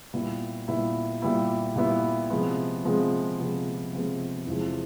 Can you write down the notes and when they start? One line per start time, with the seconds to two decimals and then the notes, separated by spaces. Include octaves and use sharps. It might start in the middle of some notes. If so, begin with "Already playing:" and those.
0.13 A#2 G3 B3 E4
0.68 A#2 G3 B3 E4
1.22 A#2 G3 B3 E4
1.76 A#2 G3 B3 E4
2.30 C3 F3 G#3 B3
2.84 C3 F3 G#3 B3
3.39 C3 F3 G#3 B3
3.93 C3 F3 G#3 B3
4.47 E2 C3 F3 G#3